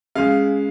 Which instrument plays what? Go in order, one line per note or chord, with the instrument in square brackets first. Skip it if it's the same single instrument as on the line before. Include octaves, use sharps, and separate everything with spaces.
[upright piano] C#3 G#3 F5